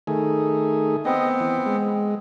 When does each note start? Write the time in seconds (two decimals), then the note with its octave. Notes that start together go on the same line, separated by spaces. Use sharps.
0.07 D#3 A3 G#4
1.05 B3 C4 D#5
1.40 E3
1.66 G#3